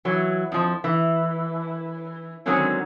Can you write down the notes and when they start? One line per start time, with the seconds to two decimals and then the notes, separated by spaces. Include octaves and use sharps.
0.05 E3 F#3
0.52 F2 F3
0.84 E3
2.46 D3 D#3 F#3 G#3 C4 C#4